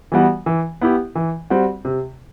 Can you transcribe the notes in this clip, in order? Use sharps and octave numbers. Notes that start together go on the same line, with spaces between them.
E3 G3 B3 F#4
E3
B3 E4 G4
E3
G3 C4 F#4
C3